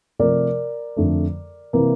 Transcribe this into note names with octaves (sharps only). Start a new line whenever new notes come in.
C3 F3 A3 A#4 D5
F2 D3 A3
C3 E3 A#3